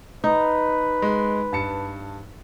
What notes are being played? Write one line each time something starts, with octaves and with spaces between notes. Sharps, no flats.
D#4 B4
G#3
G2 A5 C#7